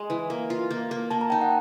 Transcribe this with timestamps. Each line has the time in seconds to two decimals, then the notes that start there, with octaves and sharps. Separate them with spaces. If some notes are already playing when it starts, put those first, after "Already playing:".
Already playing: G#3
0.10 E3
0.30 A#3
0.50 F4
0.71 A#3
0.91 A#3
1.11 A#3 A5
1.21 A#5
1.30 D#4 G5 A5
1.41 F#5